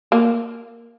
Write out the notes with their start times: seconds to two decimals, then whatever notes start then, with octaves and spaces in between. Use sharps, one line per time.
0.12 A#3